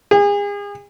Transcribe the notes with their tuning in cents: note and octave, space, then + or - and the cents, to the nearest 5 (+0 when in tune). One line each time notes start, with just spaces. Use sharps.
G#4 -35